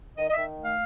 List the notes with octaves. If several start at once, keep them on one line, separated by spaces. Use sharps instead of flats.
D#3 D#5
D#5
E5
D#3
A3
F5